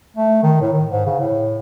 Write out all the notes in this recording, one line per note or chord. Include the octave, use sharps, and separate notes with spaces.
A3
D#3
A2
D#3
G#2
C#3
A2